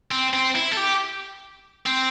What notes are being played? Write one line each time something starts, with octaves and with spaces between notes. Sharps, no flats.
C4
C4
E4
A4
G4
C4